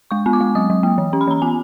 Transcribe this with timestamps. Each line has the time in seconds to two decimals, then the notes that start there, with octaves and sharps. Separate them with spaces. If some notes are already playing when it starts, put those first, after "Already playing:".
0.11 G#3 C#6
0.26 B3
0.33 D6
0.41 G#3
0.55 F#3 D#6
0.70 F#3
0.83 A#3
0.98 E3
1.13 C#4
1.21 B5
1.28 E3 A#5
1.42 B3 G#5